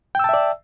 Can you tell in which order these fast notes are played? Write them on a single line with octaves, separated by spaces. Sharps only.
G5 E6 A5 E5 D5